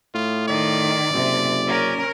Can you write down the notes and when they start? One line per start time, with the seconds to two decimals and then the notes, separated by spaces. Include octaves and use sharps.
0.14 A2 F4
0.48 D#3 D5
1.14 F#1 C3
1.67 C#4 A#4